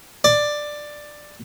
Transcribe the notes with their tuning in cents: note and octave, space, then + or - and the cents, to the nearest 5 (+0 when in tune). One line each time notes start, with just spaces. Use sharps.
D5 +10